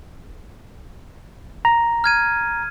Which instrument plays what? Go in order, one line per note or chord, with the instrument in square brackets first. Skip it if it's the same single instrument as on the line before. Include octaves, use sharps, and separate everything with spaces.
[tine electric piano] A#5
[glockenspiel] F6 G#6 D#7